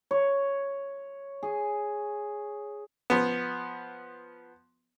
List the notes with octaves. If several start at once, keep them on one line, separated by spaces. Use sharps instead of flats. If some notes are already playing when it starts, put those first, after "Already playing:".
C#5
G#4
F3 B3